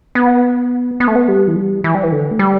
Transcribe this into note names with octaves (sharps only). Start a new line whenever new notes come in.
B3
B3
A3
B3
G3
E3
G3
E3
G3
E3
D3
A3
G3